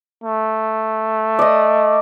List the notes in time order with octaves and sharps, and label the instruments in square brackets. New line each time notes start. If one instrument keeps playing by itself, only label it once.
[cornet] A3
[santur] D5 D#5